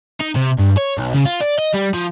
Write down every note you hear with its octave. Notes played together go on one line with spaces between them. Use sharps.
D#4
C3
G2
C#5
B1
C#3
F4
D5
D#5
G3
F3